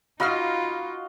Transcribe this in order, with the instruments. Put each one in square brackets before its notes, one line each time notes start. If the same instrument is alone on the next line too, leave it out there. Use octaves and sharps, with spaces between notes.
[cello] D#4 F4 [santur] F#4 D#5 F5 [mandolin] B5 F6